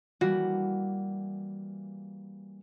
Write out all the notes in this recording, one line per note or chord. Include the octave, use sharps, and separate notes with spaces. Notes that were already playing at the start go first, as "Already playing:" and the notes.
E3 G3 A#3 F#4